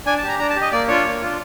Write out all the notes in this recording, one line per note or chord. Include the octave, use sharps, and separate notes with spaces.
D4 G#5
A5
G4
A#5
D4 A#5
A5
G4
D#5
A#3 D5
D4 F4 C#5
A#3
D4 F4